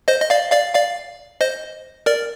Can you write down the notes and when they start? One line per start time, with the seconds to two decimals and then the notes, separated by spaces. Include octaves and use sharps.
0.08 C5 D#5
0.21 D#5
0.30 D5 F5
0.52 D5 F5
0.75 D5 F5
1.41 C5 D#5
2.06 A#4 D5